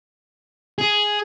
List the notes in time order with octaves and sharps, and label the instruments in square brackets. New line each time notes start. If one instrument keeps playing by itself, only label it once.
[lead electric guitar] G#4